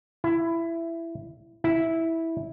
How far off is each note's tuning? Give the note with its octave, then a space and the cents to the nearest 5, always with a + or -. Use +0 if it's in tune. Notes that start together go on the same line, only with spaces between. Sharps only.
E4 +15
E4 -10